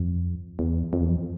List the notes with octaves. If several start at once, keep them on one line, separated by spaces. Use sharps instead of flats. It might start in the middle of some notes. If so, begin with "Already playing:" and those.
Already playing: F2
E2
F2
E2
F2